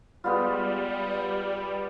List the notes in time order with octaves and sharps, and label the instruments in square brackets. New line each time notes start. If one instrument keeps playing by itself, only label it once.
[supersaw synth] G3 [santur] G#3 B3 F4 [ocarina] D5